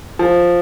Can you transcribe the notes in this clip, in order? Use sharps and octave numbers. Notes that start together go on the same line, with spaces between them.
F3